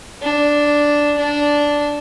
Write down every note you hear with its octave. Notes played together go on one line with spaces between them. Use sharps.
D4
D4